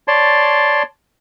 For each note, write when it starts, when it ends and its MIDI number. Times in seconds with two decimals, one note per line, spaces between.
0.08 0.83 73
0.08 0.83 74
0.08 0.83 81
0.08 0.83 84